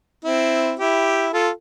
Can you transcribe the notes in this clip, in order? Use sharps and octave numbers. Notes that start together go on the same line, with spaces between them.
C4 E4
E4 G4
F4 A4